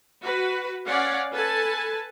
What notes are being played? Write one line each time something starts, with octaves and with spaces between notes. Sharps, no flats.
F#4 B4
C#4 D5 F5 F#5
A4 B4 G#5 A5